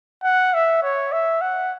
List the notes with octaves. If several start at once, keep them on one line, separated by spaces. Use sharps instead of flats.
F#5
E5
C#5
E5
F#5